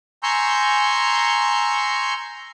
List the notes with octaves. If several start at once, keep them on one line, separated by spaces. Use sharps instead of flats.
G#5 A#5 C6 C#6 E6 G6